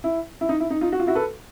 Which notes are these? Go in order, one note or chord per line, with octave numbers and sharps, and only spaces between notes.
E4
E4
D#4
E4
D#4
D#4 F4
F#4
F4
E4 F#4
A4 B4